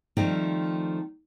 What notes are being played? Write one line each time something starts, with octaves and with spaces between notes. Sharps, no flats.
D#3 F3 G3 A3 C4 D#4